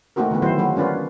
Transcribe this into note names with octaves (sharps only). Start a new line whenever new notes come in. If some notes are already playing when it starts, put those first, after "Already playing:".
A3 A#3 C4 D#4 F#4 A#4
D3 E3 A3 B3
D#3 F#3 C4 E4 F4 C5
F#3 G#3 A#3 F#4
A#3 C#4 D4 F4 B4